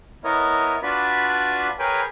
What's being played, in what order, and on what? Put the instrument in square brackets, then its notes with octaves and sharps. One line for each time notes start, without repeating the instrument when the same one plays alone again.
[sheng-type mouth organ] B3 E4 A#4 C#5 D#5
D4 F4 F#4 B4 D5 B5
G#4 A#4 B4 C#5 G5 G#5